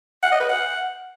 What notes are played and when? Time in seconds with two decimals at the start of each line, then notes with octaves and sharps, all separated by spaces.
0.23 F#5
0.32 D#5
0.40 B4
0.49 F#5